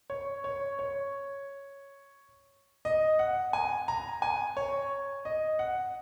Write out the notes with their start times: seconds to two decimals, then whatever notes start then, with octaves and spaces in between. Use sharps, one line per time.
0.10 C#5
0.44 C#5
0.79 C#5
2.85 D#5
3.19 F#5
3.53 G#5
3.88 A#5
4.22 G#5
4.57 C#5
5.25 D#5
5.59 F#5